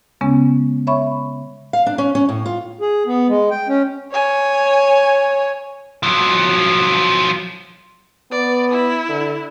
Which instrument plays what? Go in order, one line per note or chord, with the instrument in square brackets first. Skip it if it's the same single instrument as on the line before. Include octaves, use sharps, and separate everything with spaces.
[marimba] C#3 G#3 B3 C#4
C#5 E5 B5 C#6
[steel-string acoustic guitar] F5
D4
C#4
C#4
A2
F4
[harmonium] G#4
B3
G#3
G5
C#4
[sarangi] C#5 [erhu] G#5
[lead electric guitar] F3 F#3
[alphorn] B3 [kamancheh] D5
[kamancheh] E4
[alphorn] D3